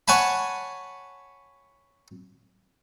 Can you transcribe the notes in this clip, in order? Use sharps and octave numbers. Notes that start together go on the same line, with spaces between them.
C#5 F#5 G#5 A5 B5